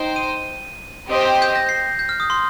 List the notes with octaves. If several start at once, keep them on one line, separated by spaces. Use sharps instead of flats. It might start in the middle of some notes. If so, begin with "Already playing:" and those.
Already playing: D#4 C5 G5
D#7
C4 G4 C5 D#5 G5
G6
A#6
C7
G6
F6
D#6
C6